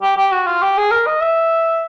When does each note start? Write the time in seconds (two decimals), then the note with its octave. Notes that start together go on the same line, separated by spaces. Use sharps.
0.02 G4
0.17 G4
0.32 F#4
0.47 F4
0.62 G4
0.77 G#4
0.91 A#4
1.07 D#5
1.21 E5